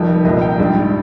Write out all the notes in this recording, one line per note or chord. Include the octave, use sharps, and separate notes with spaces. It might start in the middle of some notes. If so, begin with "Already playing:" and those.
Already playing: F1 F2 D#3 G3 G5
C2 A#2 F3 D#5
G5
A#1 G#2 G3